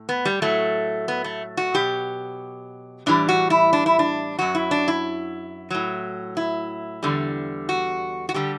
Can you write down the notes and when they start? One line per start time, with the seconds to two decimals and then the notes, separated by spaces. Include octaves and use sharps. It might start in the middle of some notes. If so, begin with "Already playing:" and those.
Already playing: A2
0.09 B3
0.25 G3
0.42 A2 F#3 A3
1.08 B3
1.24 A3
1.57 F#4
1.74 B2 F#3 G4
3.06 A2 E3 G3 D4
3.29 F#4
3.50 E4
3.73 D4
3.86 E4
3.99 D4
4.39 F#2 F#3 F#4
4.55 E4
4.71 D4
4.88 E4
5.70 A2 F#3
6.37 E4
7.03 E2 D3 G3
7.69 F#4
8.29 F#4
8.34 D3 G3 G4